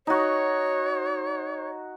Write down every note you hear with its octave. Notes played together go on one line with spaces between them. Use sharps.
D#4 F#4 C#5